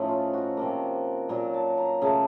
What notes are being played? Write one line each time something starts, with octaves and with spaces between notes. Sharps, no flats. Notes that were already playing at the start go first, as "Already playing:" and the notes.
Already playing: A2 F3 A3 C#4 D#4
F4
F#4
C3 F3 A#3
A#2 F#3 A#3 A#4
A5
A#5
C#3 A3 A5